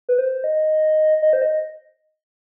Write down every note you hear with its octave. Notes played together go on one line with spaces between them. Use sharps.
B4
C5
D#5
D#5
C5
D#5